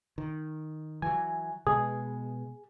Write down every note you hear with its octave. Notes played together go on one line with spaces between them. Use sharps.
D#3
E3 F#3 G#5
B2 G#3 G#4